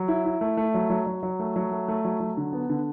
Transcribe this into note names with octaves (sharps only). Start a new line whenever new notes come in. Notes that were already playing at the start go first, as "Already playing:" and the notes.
Already playing: F#3
E4
E4
A3
A3
F#3
F#3
F#3
F#3
A3
F#3
A3
A3
F#3
F#3
D3
B3
D3